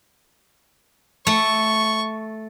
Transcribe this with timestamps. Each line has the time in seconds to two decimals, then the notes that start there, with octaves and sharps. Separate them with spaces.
1.27 A3 C#6